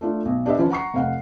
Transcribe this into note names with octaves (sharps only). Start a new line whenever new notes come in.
A3 D4 F4
B1
D4 G4 B4 D#5 E5
F3 C#4 F4 B4
F#5 A#5 C#6 C7
F1 F5 F#5